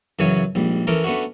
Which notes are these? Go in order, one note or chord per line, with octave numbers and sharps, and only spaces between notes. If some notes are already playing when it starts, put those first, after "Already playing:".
F#2 C#3 E3 F#3 C#5 G#5
A#1 G#2 G3
E3 C#4 A4 A#4 D6
A3 B3 C#4 D4 F#4